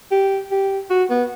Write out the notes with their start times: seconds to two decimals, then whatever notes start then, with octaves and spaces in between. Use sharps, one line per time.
0.12 G4
0.51 G4
0.90 F#4
1.10 B3